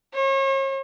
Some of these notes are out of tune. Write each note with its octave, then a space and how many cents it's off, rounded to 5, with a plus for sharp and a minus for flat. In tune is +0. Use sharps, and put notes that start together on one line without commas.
C#5 -40